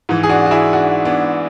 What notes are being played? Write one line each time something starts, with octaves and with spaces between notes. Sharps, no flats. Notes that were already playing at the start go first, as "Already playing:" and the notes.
G#2 E3
G#4
D4 F#4
F#4
E4 G#4
D4 F#4
B3 D4